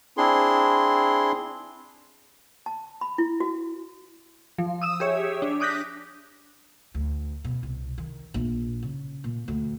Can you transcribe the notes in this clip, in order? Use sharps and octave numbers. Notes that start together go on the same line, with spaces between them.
C4 D4 E4 G#4 C6
A5
B5
E4
F#4
F3
D#6 E6 E7
G4 G#4 C#5 E5
D4
D6 D#6 F#6 G6 A#6 B6
D2
B2
C2
D#3
A#1
C#3
A#2
D2